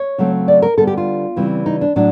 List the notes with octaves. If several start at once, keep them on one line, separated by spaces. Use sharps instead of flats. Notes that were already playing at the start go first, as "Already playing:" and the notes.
Already playing: C#5
C#3 F#3 A3 C4
D5
A#4
D3 G3 B3 A4
G4
F4
C#3 E3 G3 C4
D#4
D4
A2 F#3 D4